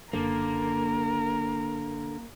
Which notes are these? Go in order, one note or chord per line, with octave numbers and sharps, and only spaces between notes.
F#1 D3 A#3 A#4